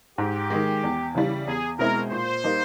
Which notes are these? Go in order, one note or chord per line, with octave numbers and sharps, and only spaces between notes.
G#2 G4
D#3 G#3
E2
C#3 E3 G3
E2 G#4
B2 G#3 C4 E4 A#4
A#2 C5
G3 A#3 D#4